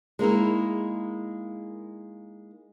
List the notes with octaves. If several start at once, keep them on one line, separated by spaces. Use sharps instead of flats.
G#3 A#3 D#4 E4